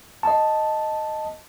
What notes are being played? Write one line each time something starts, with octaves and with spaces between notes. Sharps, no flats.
D#5 A5